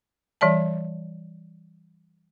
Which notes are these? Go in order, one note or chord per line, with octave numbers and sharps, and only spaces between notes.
E3 G3 D5 A5